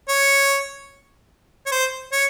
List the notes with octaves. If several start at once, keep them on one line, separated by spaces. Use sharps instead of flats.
C#5
C#5
C5
C#5